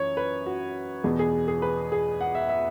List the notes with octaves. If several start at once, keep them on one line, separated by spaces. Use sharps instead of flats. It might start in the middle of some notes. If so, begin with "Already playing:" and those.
Already playing: F#2 E3 C#5
B4
F#4
E2 B2 B3 G#4
G#4
G#4
B4
G#4
F#5
E5
E5